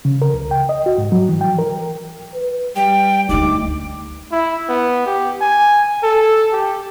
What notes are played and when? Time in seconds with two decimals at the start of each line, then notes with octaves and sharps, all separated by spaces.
0.05 C#3
0.22 A#4
0.34 C#2
0.51 G5
0.69 D#5
0.86 F#4
0.98 G#2
1.12 F#3
1.29 E3
1.41 G5
1.58 A#4
2.34 B4
2.76 G3 G5
3.29 D2 A3 D#4 D6
4.32 E4
4.69 B3
5.06 G4
5.41 G#5
6.03 A4
6.52 G4